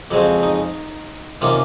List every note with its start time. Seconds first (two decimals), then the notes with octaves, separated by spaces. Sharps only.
0.11 F2 C#3 G#3 C4 F#4
0.43 D#4
1.41 C3 D#3 A#3 C#4 F4